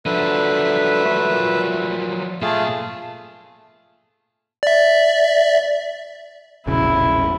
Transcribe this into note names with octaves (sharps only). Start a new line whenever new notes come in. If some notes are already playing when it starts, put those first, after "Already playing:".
D3 F3 F#3 B4 E5
A3
A#2
A#2 A3 F4 G#4 A5
D5 E5
E1 A#1 C#3 E4